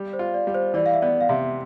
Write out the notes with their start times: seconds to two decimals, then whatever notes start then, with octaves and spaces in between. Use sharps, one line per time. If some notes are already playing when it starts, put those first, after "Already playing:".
Already playing: G3
0.13 C5
0.19 F4
0.34 D5
0.47 G3
0.55 C5
0.74 E3 D5
0.86 F5
0.93 E5
1.02 B3 D5
1.21 F5
1.29 C3 E5